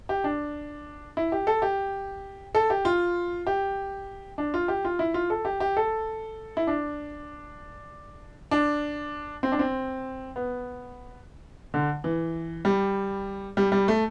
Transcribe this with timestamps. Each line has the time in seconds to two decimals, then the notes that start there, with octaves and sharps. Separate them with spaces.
0.09 G4
0.24 D4
1.17 E4
1.32 G4
1.47 A4
1.62 G4
2.55 A4
2.70 G4
2.85 F4
3.47 G4
4.38 D4
4.54 F4
4.68 G4
4.85 F4
4.99 E4
5.14 F4
5.30 A4
5.45 G4
5.60 G4
5.77 A4
6.57 E4
6.67 D4
8.51 D4
9.43 C4
9.52 D4
9.59 C4
10.36 B3
11.74 D3
12.04 E3
12.65 G3
13.57 G3
13.72 G3
13.88 A3